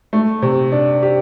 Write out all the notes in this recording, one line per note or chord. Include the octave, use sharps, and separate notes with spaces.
A3
C3
D4
G4